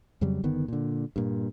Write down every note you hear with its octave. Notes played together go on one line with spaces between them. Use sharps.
F2 C#3 F#3 G3
F#1 D3 D#3 B3
A#2 D3
G2 A#2